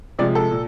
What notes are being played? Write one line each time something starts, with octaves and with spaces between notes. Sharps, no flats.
C3 F3 G#3 D5
A4
A#2